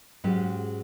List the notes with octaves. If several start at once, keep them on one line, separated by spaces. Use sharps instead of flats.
G#2 F#3 G#3 C#4 G4